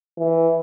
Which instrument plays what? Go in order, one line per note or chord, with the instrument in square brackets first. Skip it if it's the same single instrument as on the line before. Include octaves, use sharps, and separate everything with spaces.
[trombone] E3